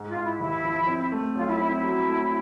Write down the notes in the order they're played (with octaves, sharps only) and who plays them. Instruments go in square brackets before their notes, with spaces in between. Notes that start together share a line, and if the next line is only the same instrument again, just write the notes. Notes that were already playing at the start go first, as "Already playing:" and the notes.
Already playing: [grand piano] G#2
[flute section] F4
[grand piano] G#2
[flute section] E4
[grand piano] D#2 [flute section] E4
[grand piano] F3
C4
A3
[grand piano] B1 [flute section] F4
[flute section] E4
[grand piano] C4 [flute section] E4
[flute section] E4
[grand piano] F#3
A3